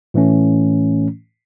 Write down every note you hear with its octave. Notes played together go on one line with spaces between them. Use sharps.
A2 E3 A3 C#4